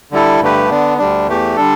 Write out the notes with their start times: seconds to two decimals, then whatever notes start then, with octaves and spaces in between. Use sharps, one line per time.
0.11 D3 G3 E4 A4
0.41 G2 D3 A3 G4 B4
0.70 D3 B3 D4
0.98 D2 D3 G3 D4
1.28 E2 E3 A3 G4
1.56 D3 G3 D4 A4